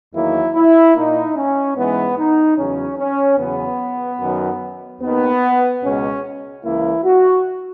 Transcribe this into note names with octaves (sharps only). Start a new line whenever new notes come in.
E2 D#3 F#3 A#3 E4
E4
A#2 A#3 D#4
C#4
G#2 E3 G#3 B3
D#4
E2 C#3 F#3 C#4
C#4
E2 C#3 F#3 B3
F#2 D#3 F#3
D#2 D#3 A#3 B3
C#2 B2 G#3 C#4
C#2 C#3 E3 A#3 E4
F#4